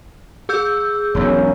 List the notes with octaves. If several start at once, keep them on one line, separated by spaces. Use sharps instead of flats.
G#4 E6 G6
E1 B1 E2 A#3 C#4 C#5